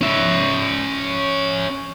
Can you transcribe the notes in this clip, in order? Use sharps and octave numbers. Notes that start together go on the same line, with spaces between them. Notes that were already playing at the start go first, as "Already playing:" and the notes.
C#4 E5